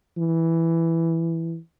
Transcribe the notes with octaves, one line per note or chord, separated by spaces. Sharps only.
E3